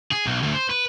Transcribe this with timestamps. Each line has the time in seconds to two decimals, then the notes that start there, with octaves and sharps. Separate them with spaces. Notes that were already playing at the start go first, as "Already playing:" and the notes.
0.11 G#4
0.26 B1
0.42 D2
0.55 C5
0.70 B4